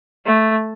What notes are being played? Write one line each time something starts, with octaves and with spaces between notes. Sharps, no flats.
A3